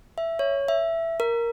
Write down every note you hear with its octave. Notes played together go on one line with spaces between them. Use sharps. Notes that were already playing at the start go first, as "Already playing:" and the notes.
E5
C#5
E5
A#4